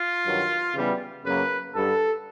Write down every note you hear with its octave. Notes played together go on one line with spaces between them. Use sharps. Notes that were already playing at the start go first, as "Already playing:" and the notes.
Already playing: F4
G2 D#3 F#3
C#3 E3 G3 B3
F#2 C#3 F#3 A#3 B4
G2 D3 G3 A4